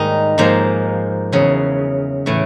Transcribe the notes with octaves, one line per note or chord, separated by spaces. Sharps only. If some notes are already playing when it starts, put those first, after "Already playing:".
Already playing: G#2 D#3 G3 A#3 D#4
G#2 F3 A#3
E2 C#3 F#3
A2 E3 A3